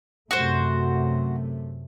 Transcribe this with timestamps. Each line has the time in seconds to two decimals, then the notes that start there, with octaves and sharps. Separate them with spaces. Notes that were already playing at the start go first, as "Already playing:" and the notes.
0.31 F#2 C3 A3 F#4 C5